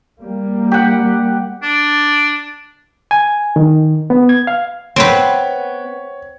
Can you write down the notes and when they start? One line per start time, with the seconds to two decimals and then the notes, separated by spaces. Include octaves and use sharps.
0.20 G3 A#3
0.72 G4 F#5
1.63 D4
3.11 G#5
3.56 D#3
4.10 B3
4.29 G#6
4.47 F5
4.96 B3 C4 B4 C#5 G5